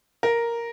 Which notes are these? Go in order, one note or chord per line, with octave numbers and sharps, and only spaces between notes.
A#4